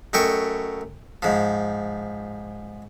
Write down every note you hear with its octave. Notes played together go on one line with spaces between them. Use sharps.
F#2 A3 D#5 G5 C#6
G#2 F3